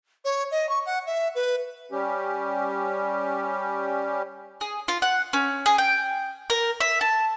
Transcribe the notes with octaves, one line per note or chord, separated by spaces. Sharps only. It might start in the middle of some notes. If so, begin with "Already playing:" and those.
C#5
D#5
C#6
F#5
E5
B4
G3 C#4 G4
G#4
F4
F#5
C#4
G#4
G5
A#4
E5
A5